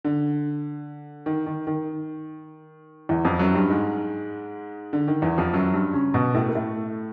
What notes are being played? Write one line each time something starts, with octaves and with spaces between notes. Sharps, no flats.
D3
D#3
D#3
D#3
E2 E3
F2 F3
F#2 F#3
G2 G3
G#2 G#3
D3
D#3
E2 E3
F2 F3
F#2 F#3
G2 G3
C#3 C#4
B2 B3
A2 A3
A#3
A2 A3